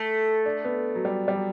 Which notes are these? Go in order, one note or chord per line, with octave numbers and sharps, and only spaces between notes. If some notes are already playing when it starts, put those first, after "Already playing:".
Already playing: A3
D4
B3
F#3
G3
G3
F#3